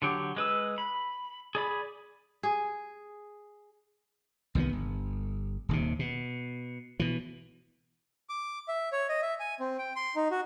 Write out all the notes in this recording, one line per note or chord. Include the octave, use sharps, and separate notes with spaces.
D3 F#3 G4
G#3 B4 E6
B5
G#4 D5 B5
G#4
C2 D#3 G3 B3
G1
D#1 D#2 C3
B2
B2 E3
D6
E5
C#5
D#5
E5
G#5
C4
G5
C6
D#4
F#4